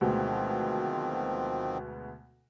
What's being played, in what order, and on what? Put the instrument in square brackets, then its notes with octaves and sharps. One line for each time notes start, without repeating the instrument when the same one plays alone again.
[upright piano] D2 B2 G#3 [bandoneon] D#3 F3 C4